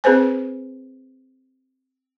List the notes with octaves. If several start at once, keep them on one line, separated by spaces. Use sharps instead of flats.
C4 G#4 B4 C5 G#5